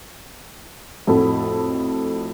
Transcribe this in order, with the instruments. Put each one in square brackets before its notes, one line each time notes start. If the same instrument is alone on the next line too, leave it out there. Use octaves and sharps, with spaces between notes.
[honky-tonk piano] F2 A2 F#4 A4 B5